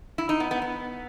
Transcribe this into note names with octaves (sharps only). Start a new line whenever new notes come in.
E4
D#4
B3
B3
B3